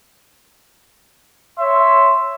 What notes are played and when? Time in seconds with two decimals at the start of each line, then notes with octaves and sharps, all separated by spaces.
1.59 C#5 E5 C6